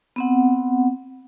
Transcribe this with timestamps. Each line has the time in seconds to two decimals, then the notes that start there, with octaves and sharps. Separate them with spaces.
0.16 B3 C4 F#5